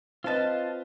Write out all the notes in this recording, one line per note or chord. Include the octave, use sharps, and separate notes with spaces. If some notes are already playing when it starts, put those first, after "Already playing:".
C4 F4 B4 D#5 A5